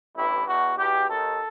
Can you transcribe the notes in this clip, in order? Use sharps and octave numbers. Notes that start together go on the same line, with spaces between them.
A1 G2 E3 E4
E2 B2 F#4
E2 B2 G4
D#2 D#3 A4